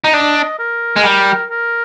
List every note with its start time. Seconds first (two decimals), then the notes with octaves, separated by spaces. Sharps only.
0.04 D#4
0.13 D4 D#5
0.59 A#4
0.96 G#3
1.04 G3 A#4
1.50 A#4